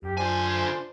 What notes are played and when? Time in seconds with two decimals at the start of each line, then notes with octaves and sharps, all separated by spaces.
0.03 F#2 G4
0.17 D3 D4 F4 C5 G#5